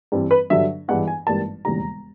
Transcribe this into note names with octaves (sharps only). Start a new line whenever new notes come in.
G2 E3 G3 C4
B4
G2 D3 F#3 E5
G2 E3 G#3 B3 E4 F#5
G#5
G#1 G2 E3 G3 A#3 A5
E1 D#2 C#3 E3 G3 A#5